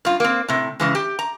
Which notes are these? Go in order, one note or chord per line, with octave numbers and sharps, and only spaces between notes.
G2 F4
A#3 C4
A2 C3
C#3 E3 G#3
G4
A#5